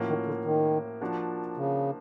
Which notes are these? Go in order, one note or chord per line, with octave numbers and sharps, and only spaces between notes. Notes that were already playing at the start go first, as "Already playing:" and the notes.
Already playing: A2 F3 A#3 C#4 F#4
D#3
D3
D#3
F3 A#3 D4 F#4
C#3